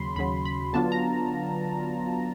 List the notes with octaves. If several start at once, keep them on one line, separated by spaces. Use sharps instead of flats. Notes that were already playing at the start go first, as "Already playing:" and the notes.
Already playing: D#2 C#3 F#3 B5 C6
D#2 C#3 F#3 B5
B5
D3 F#3 B3 D4 F4 A5
A#5